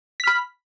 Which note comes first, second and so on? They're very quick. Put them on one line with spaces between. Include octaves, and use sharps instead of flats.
B6 F6 B5